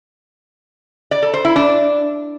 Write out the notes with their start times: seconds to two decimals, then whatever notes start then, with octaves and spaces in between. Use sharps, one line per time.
1.11 D5
1.22 A4
1.34 C5
1.45 E4
1.56 D4